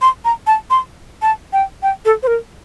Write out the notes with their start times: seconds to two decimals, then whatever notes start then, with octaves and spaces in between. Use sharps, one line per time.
0.02 C6
0.25 A#5
0.47 A5
0.70 C6
1.22 A5
1.53 G5
1.83 G5
2.05 A4
2.23 C5
2.27 A#4